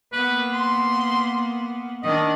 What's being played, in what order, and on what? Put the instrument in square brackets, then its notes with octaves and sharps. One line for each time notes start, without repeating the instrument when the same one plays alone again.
[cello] A#3 B3 [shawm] B4
[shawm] C6
[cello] D#3 D4 [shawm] D#5